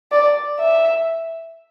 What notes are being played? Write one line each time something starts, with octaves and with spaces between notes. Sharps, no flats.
D5
E5